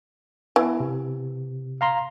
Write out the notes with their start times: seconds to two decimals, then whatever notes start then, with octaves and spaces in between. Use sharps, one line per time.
0.56 E3 B3
0.80 C3
1.81 F5 A#5 C6